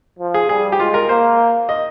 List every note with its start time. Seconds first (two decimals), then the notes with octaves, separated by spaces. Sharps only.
0.19 F3
0.34 G#4
0.49 G3 G#4
0.72 G4
0.79 G#3 F4
0.94 A#4
1.09 A#3 C5
1.69 D#5